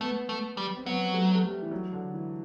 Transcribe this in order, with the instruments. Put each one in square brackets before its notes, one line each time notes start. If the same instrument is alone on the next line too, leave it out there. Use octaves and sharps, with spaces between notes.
[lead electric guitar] A3 [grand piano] B3
[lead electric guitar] A3
G3
[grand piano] C4
[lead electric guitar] F#3 [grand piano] B3
[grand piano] A3
A3
G3
E3
F#3
D3
E3